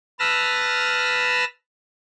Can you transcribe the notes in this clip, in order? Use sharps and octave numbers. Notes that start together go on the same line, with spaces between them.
B4 A5 E6 F6 A#6